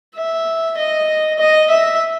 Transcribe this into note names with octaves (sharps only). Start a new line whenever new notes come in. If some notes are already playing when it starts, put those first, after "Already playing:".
E5
D#5
D#5
E5